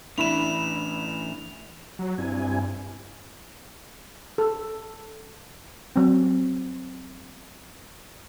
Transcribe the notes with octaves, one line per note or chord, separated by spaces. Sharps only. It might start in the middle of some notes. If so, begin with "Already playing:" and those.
A2 E3 D4 E4 B5 E7 F7
F#3
G2 C4 E4 G#5
A4
F#3 C4